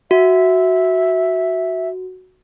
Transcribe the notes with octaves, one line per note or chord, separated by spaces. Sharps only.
F#4 E5